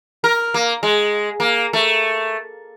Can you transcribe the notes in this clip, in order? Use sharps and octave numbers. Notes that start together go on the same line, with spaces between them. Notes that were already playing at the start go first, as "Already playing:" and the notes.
A#4
A#3
G#3
A#3
A3